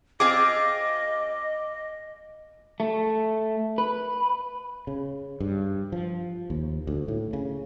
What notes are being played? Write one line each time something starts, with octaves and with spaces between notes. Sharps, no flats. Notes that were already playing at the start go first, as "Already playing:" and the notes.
C4 F4 G#4 D#5 D6
A3
B4
C#3
G2
F3
D#2
D2
A2
C#3